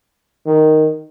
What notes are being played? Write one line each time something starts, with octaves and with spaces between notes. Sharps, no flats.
D#3